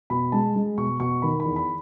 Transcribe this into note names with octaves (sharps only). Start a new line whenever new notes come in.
B2 B5
G#3 A5
G#3
B2 C#6
B2 C#6
D#3 B5
B5
E2
B5